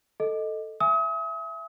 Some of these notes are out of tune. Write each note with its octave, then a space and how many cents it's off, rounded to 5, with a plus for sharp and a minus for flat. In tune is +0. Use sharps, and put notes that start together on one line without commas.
A4 +0 D#5 +0
E5 +20 G#5 +0 D#6 +40